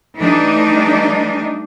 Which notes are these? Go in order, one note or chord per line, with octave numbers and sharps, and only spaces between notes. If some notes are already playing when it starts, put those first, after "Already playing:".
E3 G3 A3 D4 D#4